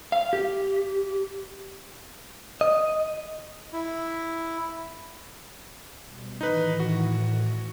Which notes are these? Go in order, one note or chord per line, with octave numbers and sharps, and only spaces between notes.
F5
G4
D#5
E4
B2 G3
A2 D#3 E3 D#4 B4
F#4